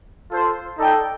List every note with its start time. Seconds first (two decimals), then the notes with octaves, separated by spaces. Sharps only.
0.30 F4 A4 C5
0.78 D#4 A4 D5 G5